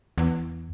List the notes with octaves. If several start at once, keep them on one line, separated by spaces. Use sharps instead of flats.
E2